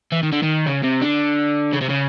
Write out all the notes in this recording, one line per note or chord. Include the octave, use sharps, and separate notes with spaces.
E3
D#3
D3
D#3
C#3
C3
D3
C#3
C3
C#3